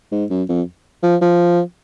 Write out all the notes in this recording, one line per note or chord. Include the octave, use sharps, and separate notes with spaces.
G#2
F#2
F2
F3
F3